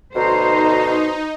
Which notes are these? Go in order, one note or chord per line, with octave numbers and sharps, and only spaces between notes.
D2 B2 D#4 C5 A#5